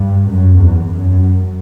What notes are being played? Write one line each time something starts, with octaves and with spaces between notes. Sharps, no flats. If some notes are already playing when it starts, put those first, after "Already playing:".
Already playing: G2
F#2
E2
F#2